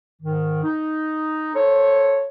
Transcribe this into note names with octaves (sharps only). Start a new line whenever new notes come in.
G#2 D#3
D#4
A4 C5 C#5